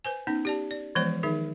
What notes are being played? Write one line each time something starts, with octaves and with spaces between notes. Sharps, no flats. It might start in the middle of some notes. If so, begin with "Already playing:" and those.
B4 C5 G#5
B3 C#4 D#4
G4 D5 A5
D5
E3 F3 G#3 B3 C5 D5
D#3 D#4 G#4 E5